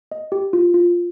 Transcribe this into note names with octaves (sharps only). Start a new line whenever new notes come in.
D#5
G4
F4
F4